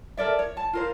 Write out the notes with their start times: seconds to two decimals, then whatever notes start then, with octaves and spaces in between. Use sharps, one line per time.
0.17 A4 A#4 D5 E5
0.39 C#5
0.57 A5
0.73 F4 A#4 C5